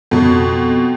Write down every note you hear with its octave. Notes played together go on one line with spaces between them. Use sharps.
F2 B2